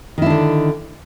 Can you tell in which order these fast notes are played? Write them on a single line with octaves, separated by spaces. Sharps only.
D#3 E4 D4 D3